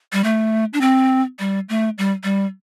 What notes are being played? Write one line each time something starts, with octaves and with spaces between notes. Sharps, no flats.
G3
A3
D4
C4
G3
A3
G3
G3